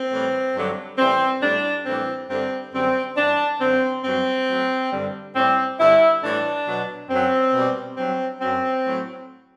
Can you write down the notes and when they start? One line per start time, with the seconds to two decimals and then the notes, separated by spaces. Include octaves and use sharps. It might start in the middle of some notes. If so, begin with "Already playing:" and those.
Already playing: C4
0.11 A2 E3 G3
0.55 G2 D3 F#3
0.98 A2 E3 G3 C4
1.42 A2 G3 D4
1.86 A2 E3 G3 C4
2.29 G2 D3 G3 C4
2.73 F#2 D3 G3 C4
3.17 G2 E3 G3 D4
3.60 F#2 D3 F#3 C4
4.04 G2 F#3 C4
4.48 A2 F#3
4.92 G2 D3 G3
5.35 A2 G3 C4
5.79 G2 D3 G3 E4
6.22 A2 E3 G3 D4
6.66 B2 F#3
7.10 F#2 F#3 C4
7.53 B2 G3
7.97 G2 F#3 C4
8.41 F#2 F#3 C4
8.85 A2 F#3